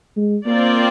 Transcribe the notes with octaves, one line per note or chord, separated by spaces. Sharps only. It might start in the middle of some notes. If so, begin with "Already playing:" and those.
G#3
A#3 C4 F4 A#4 D5